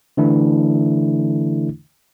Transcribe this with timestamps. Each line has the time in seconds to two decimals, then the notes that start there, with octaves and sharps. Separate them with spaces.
0.17 D3 E3 A3 D4 E4